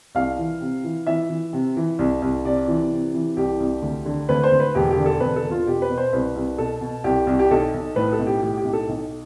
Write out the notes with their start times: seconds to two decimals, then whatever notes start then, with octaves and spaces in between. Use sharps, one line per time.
0.15 C2 F5
0.39 E3
0.61 C3
0.84 E3
1.07 E3 E5
1.29 E3
1.53 C3
1.77 E3
1.99 C2
2.22 C2
2.45 C3 D5
2.68 E3
2.91 C3
3.14 E3
3.37 C2 G4
3.60 C2
3.82 D2
4.05 D3
4.29 D2 B4
4.43 C5
4.52 D2
4.60 B4
4.75 E1 G4
4.91 G4
4.97 D3
5.06 A4
5.20 E1 B4
5.36 A4
5.44 E1
5.51 F4
5.66 B2 G4
5.82 B4
5.90 B2
5.98 C5
6.13 C2 B4
6.36 C2
6.58 B2 A4
6.81 B2
7.04 C2 G4
7.27 C2
7.39 G4
7.51 B1 A4
7.74 B1
7.96 A2 B4
8.12 A4
8.19 B1
8.27 G4
8.43 A2 G4
8.57 G4
8.65 B1
8.73 A4
8.89 B1